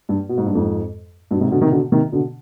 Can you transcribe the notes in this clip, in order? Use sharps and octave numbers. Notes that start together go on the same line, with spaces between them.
G2
B2
G#2
G2
F2 G#2
G2 B2
G#2 C3
B2 D3
C3 D#3
B2 D3
C3 D#3
B2 D3